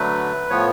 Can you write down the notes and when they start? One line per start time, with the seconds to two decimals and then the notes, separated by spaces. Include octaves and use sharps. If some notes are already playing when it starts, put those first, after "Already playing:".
Already playing: D3 F#3 A3 B4
0.50 A2 F3 B3 C#5